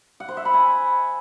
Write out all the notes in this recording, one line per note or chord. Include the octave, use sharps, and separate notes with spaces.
F#5
C5
E5
B5
G#5